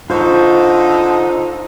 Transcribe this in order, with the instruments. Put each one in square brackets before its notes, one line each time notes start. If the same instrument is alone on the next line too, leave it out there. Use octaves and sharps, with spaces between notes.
[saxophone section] D3 D#4 [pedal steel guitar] F4 C5 C#6